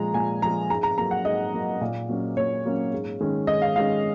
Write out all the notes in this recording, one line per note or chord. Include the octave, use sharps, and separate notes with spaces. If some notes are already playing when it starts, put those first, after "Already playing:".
Already playing: A#2 F3 G#3 A#5
A#2 G#5
F3 G#3 A#5
G#2 A#5
A#5
F#3 A#3 A#5
F#5
G#2 D#5
F#3 A#3
A#2
F#3 A#3 C#4
A#2 C#5
F#3 A#3 C#4
G#2
D#3 G#3 C#4
G#2 D#5
F5
D#3 G#3 C#4 F5